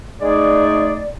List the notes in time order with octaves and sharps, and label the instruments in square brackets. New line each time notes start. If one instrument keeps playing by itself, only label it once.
[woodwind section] G#3 A3 D#4 G#4 D5